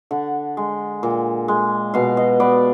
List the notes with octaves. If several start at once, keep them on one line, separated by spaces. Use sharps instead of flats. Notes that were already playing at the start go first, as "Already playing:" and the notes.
D3 F#5
G#3
A#2
G#3
B2 F5
D#5
B3 D5